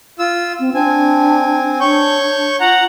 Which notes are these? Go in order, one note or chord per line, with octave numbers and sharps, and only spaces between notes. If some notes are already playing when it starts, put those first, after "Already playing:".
F4 E6
C4
C4 D4 G#5
D4 C#5 C#6 G6
F4 F#5 A#5